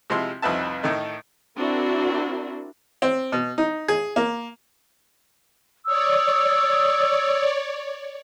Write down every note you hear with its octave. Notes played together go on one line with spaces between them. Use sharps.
C3 F3 G#3 E4 C6
C2 F2 D#4 B4 E5 A5
A2 D#3 A3 D#4
C4 D4 E4 F#4 A#4
C4
B2
D#4
G#4
A#3
C#5 D5 D#6 E6